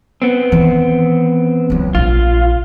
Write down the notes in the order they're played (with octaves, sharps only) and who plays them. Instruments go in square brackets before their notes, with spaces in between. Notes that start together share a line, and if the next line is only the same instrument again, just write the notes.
[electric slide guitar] B3 C4
[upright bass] D#3 E3
C#2 F#3
[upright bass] A#1 [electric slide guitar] F4